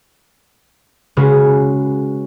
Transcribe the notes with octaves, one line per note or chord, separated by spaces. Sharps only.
C#3 G#3 C#4 F#4 B4